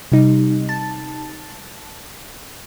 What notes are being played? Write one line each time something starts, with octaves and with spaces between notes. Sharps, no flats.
C3 G3 D#4
A5